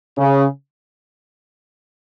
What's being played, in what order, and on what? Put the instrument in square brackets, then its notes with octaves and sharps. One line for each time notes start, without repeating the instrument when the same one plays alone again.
[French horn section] C#3